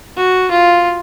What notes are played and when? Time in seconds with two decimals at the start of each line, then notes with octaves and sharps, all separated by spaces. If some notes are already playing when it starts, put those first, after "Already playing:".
0.16 F#4
0.51 F4